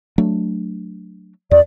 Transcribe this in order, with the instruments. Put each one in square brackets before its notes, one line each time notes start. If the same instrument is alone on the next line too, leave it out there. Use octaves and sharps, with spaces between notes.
[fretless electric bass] F#3 A3 D4
[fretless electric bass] E2 [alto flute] D5